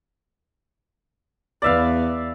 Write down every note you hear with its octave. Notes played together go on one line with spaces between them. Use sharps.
E2 B3 D5 E5 F5